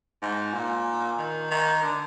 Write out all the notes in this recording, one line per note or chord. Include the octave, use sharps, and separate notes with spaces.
G#2
A#2
D#3
D#3
D3